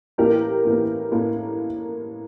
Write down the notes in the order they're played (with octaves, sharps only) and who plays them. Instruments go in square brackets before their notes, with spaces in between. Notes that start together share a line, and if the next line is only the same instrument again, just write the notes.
[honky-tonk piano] A2 E3 A#3 G4 A#4
A2 E3 A#3
A2 A#3